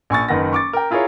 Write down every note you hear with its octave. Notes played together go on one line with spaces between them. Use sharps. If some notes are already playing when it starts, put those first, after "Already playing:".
A#1 G#5 C#6 A6
F#1 D#3 B4 F#5 A#6
C#6 D6 A6
A#4 G5
E4 F4 G#4 A#4 C#5